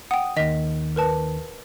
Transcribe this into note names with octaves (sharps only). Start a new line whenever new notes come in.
F#5 G5 D#6
D#2 D#3 D#5 B6
A#4 B4 A5